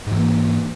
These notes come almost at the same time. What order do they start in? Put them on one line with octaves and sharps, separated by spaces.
G#2 E3 A#3